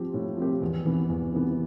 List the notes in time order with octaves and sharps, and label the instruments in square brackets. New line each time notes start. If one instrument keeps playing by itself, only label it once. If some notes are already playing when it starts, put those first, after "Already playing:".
Already playing: [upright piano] F3 C4 G4
A2
F3 C4 G4
E2
C3 E3 B3
E2
C3 E3 B3